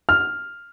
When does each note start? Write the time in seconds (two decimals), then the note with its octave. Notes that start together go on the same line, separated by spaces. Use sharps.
0.09 F6